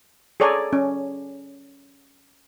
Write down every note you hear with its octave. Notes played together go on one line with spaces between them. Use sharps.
G#4 A4 C#5 D5 G#5 A#5
C#4